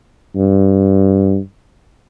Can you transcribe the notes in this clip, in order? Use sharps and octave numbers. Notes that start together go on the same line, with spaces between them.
G2